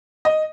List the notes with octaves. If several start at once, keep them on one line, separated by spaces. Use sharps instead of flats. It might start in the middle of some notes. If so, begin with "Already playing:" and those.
D#5